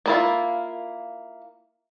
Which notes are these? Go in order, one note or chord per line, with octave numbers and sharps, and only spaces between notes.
A#3 E4 F4